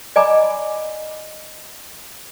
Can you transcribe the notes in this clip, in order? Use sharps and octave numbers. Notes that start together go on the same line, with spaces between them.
D5 D#5 G#5 A#5 B5 D6